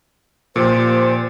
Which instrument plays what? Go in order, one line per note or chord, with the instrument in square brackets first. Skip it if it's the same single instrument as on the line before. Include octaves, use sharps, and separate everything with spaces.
[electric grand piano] A#2 F3 G4 [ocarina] C5